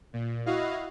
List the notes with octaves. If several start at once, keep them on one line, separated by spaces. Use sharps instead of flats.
A#2
E4 F#4 D#5 F5